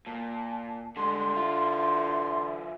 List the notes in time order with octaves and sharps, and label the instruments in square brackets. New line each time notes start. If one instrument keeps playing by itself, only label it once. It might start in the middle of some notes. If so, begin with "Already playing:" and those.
[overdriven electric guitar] A#2 [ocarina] A5
[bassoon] D3 [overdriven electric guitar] G3 G#3 [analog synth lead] C6
[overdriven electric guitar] E3 F4 [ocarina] E5